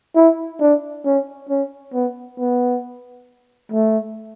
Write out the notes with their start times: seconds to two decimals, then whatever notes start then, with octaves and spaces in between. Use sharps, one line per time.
0.16 E4
0.60 D4
1.05 C#4
1.49 C#4
1.93 B3
2.39 B3
3.72 A3